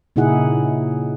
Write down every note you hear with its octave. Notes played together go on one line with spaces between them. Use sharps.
A#2 C#3 D#4 E4 G#4 F#5